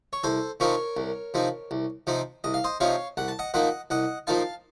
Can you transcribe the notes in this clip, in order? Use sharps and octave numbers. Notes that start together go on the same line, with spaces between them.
C#5
C2 A4 C5
C3 F3 C4 D#4 A#4 C#5
C2
C3 F3 C4 D#4
C2
C3 F3 C4 D#4
C2 D#5
F5
C5 D#5
C3 F3 C4 D#4 C#5 F5
C2 F#5
A5
D#5 F#5
A#2 F3 A#3 D#4 D#5 F#5
C2 D#5 F#5
A#2 F3 A#3 D#4 F5 A5